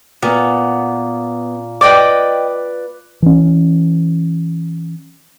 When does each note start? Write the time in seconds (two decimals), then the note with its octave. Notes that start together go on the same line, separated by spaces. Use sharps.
0.22 A#2 B3
1.81 B4 D5 D#5 G5 D6
3.22 E3 C#4